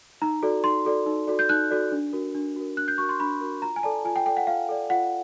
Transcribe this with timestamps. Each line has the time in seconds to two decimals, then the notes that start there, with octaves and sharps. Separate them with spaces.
0.22 D#4 A#5
0.43 F#4 A4 D5
0.64 D#4 C6
0.85 F#4 A4 D5
1.06 D#4
1.27 F#4 A4 D5
1.39 G6
1.49 D#4 F#6
1.71 F#4 A4 D5
1.92 D4
2.13 F#4 A#4
2.35 D4
2.56 F#4 A#4
2.77 D4 F#6
2.88 G6
2.98 F#4 A#4 C#6
3.09 C6
3.20 D4 B5
3.41 F#4 A#4
3.62 F4 A#5
3.76 G#5
3.83 A4 D5 A5
4.05 F4 G#5
4.16 G5
4.26 A4 D5 G5
4.37 F#5
4.47 F4 F5
4.69 A4 D5
4.90 F4 F#5